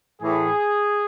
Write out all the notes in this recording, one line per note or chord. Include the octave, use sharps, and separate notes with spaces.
A2 E3 G#4